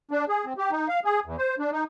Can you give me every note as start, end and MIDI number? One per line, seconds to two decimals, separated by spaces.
0.11 0.25 62
0.28 0.45 68
0.45 0.53 60
0.58 0.71 67
0.71 0.88 63
0.88 1.00 77
1.05 1.20 68
1.26 1.36 40
1.38 1.55 72
1.59 1.71 62
1.72 1.84 63